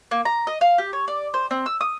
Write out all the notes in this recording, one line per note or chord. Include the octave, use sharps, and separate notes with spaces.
A#3
A#5
D#5
F5
G4
C#5
D5
C5
C4
E6
D#6